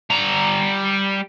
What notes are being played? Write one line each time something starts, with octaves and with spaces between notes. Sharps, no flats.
G3 A#5